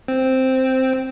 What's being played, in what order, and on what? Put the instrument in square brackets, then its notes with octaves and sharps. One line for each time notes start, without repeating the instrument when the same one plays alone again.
[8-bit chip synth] C4